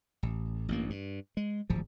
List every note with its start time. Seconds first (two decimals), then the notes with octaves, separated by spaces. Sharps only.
0.23 A1
0.68 A1 G2 A#3
0.90 G2
1.37 G#3
1.70 D1 G#1 F3